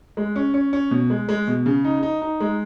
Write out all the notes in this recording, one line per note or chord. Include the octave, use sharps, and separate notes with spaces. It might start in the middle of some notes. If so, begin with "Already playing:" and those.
G#3
C#4
C#4
C#4
B2
G#3
G#3
B2
C#3
D#4
D#4
D#4
G#3